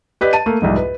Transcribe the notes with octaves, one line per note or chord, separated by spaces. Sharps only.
G4 B4 D5 D#5
A5 D#7
A3 A#3
C2 F2 G#2
B4